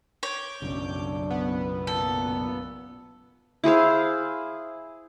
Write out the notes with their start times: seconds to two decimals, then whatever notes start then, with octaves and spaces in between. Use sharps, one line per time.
0.23 C#5 D6 G6
0.62 B1 F#2 C#3 D4
1.30 B3
1.87 A#2 A4
3.64 E4 G#4 C5 F5